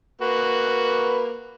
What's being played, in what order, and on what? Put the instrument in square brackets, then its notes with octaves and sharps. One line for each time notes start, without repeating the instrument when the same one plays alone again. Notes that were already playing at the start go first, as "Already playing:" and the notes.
[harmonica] A#3 F#4 B4